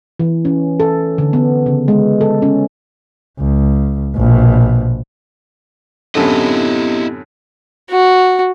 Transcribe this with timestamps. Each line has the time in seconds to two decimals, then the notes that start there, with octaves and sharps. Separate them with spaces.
0.20 E3
0.45 C#4
0.80 A4
1.18 D3
1.33 B3
1.66 C#3
1.88 G#3
2.21 A4
2.42 C#4
3.40 C#2
4.16 A#1 B2
6.15 F#2 A2 D3 B3 C4 E4 G4 D#5
7.90 F#4